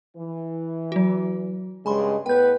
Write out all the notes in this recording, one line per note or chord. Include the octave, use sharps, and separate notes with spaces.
E3
F#3 F#4
G2 C#3 G#3 G#5 B5 C6
A2 B3 B4 G5 G6